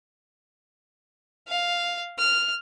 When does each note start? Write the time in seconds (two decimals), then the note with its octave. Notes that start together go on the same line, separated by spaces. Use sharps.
1.47 F5
2.18 F6